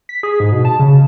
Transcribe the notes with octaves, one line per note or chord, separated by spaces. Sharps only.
B6
G#4
G#2
B2
A5
C#3